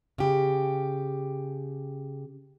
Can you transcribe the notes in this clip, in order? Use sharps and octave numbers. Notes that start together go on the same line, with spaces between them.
C#3 G4